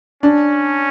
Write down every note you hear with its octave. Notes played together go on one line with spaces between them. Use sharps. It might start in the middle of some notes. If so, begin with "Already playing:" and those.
C#4 D4